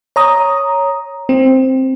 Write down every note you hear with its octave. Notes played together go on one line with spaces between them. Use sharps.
C#5 A#5 D#6
C4